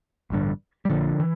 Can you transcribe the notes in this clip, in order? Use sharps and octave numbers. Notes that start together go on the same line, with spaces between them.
A1 G2 D3
G3
A#1 A#2 D3 F3
E3